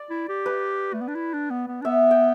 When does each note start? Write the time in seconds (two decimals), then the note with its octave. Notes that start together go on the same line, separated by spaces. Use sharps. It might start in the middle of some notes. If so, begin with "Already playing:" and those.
Already playing: D5
0.10 E4
0.29 G4
0.46 B4
0.93 A3
1.01 B3
1.08 D4
1.15 E4
1.33 D4
1.50 B3
1.68 B3
1.82 D4
1.85 B3 E5
2.11 G5